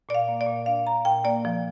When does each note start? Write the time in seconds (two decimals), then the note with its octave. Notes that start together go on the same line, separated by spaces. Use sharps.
0.09 A#2 D5
0.15 F5
0.28 A#3
0.41 D5
0.47 A#2
0.66 D4 F5
0.86 A#2 A#5
1.05 A#2 G5
1.24 A#3 D5
1.45 F3